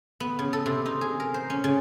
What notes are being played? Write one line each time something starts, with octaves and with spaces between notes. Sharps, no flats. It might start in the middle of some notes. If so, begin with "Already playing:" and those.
B3
C#3
A4
C3
D#4
G#4
A#4
C5
C#4
C#3